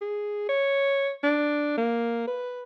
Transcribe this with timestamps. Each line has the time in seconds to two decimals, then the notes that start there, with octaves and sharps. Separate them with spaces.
0.01 G#4
0.49 C#5
1.23 D4
1.77 A#3
2.27 B4